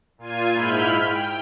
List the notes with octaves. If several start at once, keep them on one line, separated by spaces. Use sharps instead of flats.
A#2 F4 G#6 D#7
G#2 E4 B5 F6 G6
G5